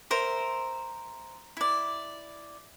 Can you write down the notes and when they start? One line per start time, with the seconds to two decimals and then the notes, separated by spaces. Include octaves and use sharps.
0.10 A#4 C5 E5
1.57 E4 D5